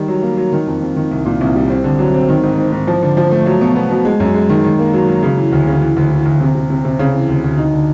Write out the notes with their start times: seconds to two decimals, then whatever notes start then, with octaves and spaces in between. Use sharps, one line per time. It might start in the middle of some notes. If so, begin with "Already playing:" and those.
Already playing: D#3 G3
0.08 F#3
0.22 A#3
0.37 F#3
0.52 D#3
0.67 F2
0.81 F2
0.96 D#3
1.11 C2
1.25 A#2
1.41 C2
1.55 G3
1.70 C4
1.84 D3
1.99 F#3
2.14 C4
2.29 D#3
2.43 G#2
2.58 G#2
2.72 G#2
2.87 F3
3.02 D3
3.17 F3
3.31 A3
3.46 F#3
3.61 B2
3.75 B3
3.91 B2
4.05 G#3
4.20 F#2
4.34 G#3
4.49 D#3
4.64 D#3
4.79 A#3
4.93 F#3
5.08 F#3
5.23 C#3
5.37 E3
5.52 D2
5.67 C#3
5.82 E3
5.96 D2
6.11 E3
6.26 D2
6.40 C3
6.55 C3
6.70 C3
6.85 C3
6.99 C#3
7.14 E3
7.29 D2
7.44 D2
7.58 D#4
7.73 D3